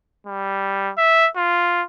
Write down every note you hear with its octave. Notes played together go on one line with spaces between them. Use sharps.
G3
E5
F4